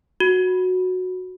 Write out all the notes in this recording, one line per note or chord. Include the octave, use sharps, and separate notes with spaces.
F#4